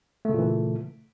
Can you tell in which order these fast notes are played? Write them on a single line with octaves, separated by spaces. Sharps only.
A3 C#3 A#2 E3